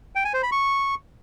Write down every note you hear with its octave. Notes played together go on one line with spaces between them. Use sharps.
G5
G#5
C5
B5
C#6